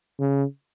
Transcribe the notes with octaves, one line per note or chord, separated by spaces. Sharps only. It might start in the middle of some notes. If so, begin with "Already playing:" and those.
C#3